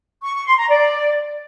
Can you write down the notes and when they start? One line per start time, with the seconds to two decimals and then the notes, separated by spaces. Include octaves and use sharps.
0.23 C#6
0.35 C#6
0.46 C6
0.58 A#5
0.69 D5